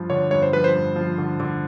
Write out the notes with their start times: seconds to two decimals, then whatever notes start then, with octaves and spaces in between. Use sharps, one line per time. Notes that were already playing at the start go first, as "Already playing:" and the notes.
Already playing: G2 F3
0.10 D3 C#5
0.31 G2 C#5
0.42 C5
0.53 F3 B4
0.64 C5
0.75 G2
0.96 F3
1.18 D3
1.40 D3